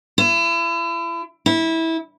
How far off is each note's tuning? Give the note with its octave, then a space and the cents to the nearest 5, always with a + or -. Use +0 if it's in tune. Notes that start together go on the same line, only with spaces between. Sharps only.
E4 +35
E4 -20